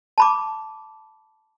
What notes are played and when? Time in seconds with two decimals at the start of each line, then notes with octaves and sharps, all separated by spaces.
0.18 A5 B5 D6